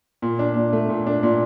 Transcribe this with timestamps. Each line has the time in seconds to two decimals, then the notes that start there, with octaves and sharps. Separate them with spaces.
0.22 A#2
0.39 D4
0.56 A#2
0.73 A3
0.89 A#2
1.07 D4
1.23 A#2